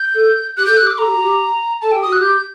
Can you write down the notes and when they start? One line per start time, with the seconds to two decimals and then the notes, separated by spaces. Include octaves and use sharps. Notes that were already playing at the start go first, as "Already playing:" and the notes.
Already playing: G6
0.14 A4
0.57 G4 F#6
0.66 A4 G6
0.77 G4 F#6
0.87 D6
0.97 A4 A#5
1.05 G4
1.14 F#4
1.22 G4
1.81 A4 A5
1.92 G4 G5
2.02 F#4 D#6
2.13 F#6
2.18 G4 G6